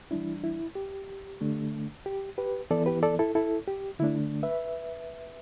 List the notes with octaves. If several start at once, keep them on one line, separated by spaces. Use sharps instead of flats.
E3 G3 D4 E4
E4
G4
D3 A3 D4
G4
G4 B4
E3 B3 E4 A4 D5
G4 B4
A4 D5
E4 A4
E4 A4
G4
D3 A3 D4 E4
B4 E5